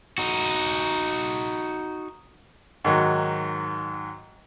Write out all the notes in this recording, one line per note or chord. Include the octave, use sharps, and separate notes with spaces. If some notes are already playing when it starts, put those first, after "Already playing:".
D#4 F#4
G#2 D#3 F#3